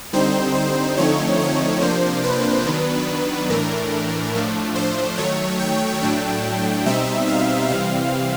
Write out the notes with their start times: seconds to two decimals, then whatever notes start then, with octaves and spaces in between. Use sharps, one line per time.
0.13 D3 G3 C4 D#4 C5
0.55 C5
0.97 D3 F3 A3 C4 D#4 C#5
1.39 C#5
1.81 C3 F3 A#3 D4 C5
2.24 B4
2.65 D#3 F#3 B3 D4
3.49 A2 E3 A3 D4 A#4
4.33 A2 F3 A3 D4
4.75 C5
5.18 D#3 F#3 A3 C#5
5.59 G5
6.02 A2 F#3 A3 D4
6.86 B2 G3 C4 D#4 E5
7.28 F5
7.70 C3 E3 G3 C4 F5